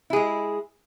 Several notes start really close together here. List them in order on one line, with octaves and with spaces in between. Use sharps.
E4 G#4 G#3